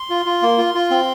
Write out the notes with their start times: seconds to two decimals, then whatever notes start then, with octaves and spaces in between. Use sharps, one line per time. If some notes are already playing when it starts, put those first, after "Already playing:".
Already playing: C6
0.10 F4
0.26 F4
0.42 A#3
0.58 F4
0.75 F4
0.91 C4